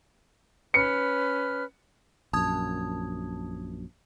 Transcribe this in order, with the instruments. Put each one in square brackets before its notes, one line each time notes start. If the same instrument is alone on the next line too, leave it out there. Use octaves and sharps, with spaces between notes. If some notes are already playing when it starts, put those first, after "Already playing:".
[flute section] C#4 B4 F6 [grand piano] C#7
[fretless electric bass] A#1 F#2 [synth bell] A5 D#6 G#6